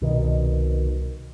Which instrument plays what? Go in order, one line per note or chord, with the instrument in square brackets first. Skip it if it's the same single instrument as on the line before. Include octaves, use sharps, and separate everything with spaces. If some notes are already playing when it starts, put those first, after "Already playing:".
[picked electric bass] C2 B2 D#3